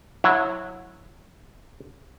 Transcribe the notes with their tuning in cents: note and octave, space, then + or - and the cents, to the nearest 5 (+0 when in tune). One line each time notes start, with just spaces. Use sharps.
F#3 -20 E4 +0